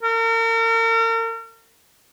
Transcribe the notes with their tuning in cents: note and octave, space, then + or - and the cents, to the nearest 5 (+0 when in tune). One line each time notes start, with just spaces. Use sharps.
A#4 -40